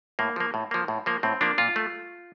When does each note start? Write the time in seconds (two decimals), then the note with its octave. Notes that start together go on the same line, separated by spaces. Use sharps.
0.19 A2 A#3
0.36 F3 A#3
0.54 A2
0.71 F3 A#3
0.88 A2
1.06 F3 A#3
1.23 A2 C4
1.41 F3 A#3 D4
1.58 A#2 F4
1.76 A3